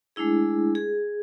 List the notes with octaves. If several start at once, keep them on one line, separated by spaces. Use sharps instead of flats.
G#3 A3 D4 E4 G#4
G#4